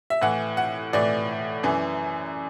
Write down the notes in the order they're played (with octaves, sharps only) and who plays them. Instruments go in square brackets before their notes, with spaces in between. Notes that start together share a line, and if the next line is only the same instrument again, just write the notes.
[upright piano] E5
A2 E3 F#5
F#5
A2 E3 D5
F#2 E3